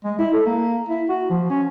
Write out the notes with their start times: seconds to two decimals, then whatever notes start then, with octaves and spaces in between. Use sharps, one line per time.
0.04 G#3
0.19 E4
0.33 A4
0.46 A#3
0.89 E4
1.09 F#4
1.30 F3
1.49 C#4